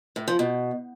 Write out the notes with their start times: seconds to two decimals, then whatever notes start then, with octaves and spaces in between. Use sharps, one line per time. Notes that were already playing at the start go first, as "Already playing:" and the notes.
0.16 A2
0.28 F3
0.39 B2